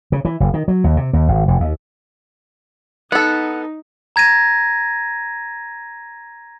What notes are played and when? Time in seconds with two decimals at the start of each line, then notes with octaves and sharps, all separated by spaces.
0.12 C#3
0.25 E3
0.40 F#1
0.54 D#3
0.68 F#3
0.84 D#2
0.97 C3
1.13 D#2
1.28 G#1
1.48 F1
1.60 D#2
3.12 B3 D#4 A4 F#5
4.16 A#5 G#6 A#6 D#7